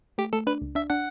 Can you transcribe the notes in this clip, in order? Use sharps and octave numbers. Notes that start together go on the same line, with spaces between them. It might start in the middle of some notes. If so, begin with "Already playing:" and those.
A3 G4
A3 A4
D4 B4
C#2
D4 E5
D4 F#5